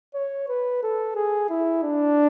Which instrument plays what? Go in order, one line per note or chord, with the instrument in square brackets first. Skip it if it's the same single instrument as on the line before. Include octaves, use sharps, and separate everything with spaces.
[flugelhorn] C#5
B4
A4
G#4
E4
D4